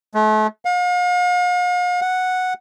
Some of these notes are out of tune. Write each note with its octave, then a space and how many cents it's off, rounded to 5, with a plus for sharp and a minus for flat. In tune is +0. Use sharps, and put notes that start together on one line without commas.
A3 -35
F5 +45
F#5 -5